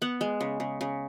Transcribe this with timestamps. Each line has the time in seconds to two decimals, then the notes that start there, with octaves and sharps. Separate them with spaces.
0.02 B3 F#5
0.21 G#3
0.41 C#3
0.60 C#3
0.81 C#3